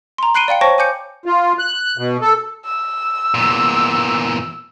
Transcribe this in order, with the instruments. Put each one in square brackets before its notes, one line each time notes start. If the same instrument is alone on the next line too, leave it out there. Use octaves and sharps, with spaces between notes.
[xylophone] A#5 C6
B5 F#6 C7 D7 D#7 G7
D5 F5 G5 C#7
C5 C#5 G5 A5 C#6 A#6
G#5 D6 G6 C#7
[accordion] F4
F#6
B2
A4
[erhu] E6
[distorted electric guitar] E2 A#2